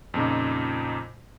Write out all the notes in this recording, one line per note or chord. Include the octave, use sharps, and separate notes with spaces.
F2 A#2 C#3 D#4